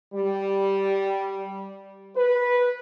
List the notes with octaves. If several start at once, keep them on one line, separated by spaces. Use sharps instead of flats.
G3
B4